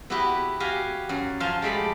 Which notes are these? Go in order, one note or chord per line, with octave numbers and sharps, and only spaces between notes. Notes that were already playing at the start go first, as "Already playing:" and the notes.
B3 E4 F#4 G4 B4
F#4 G4 F5 G#5
F#2
F3 C5 F5 G#5 A5 C6
G#3 A3 G4 D5 B5